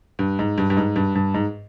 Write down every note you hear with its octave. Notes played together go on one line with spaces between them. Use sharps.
G2
G#2
G2
G2
G#2
G2
G2
G#2